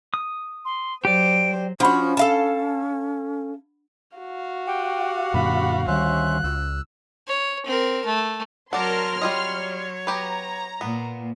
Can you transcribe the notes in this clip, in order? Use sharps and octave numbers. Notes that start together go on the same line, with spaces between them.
D#6
C6
F#3 G4 C5 D5 D7
F3 C#4 D4 F#4 F#5 B5
A4 F5 A5
F#4 F5
G4 F#5 G5
F#2 A#2 D3 B5
D2 D#3 G3 C#4 C5 E5 F#6
C#2 E6
C#5
C4 A#4
A3
F#3 A#4 D5 F#5 A5 C6 F6
F#3 G3 F4 C#5 D#5
B3 G4 B4 A#5
A#2 B3